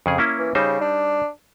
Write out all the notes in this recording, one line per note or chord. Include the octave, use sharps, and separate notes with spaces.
F2 C#3 G#4
A#3 C#4 E4
E3
C#3 G3 D#4 C5
D4